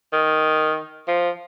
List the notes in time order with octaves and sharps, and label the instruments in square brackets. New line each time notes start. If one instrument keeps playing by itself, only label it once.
[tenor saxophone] D#3
F3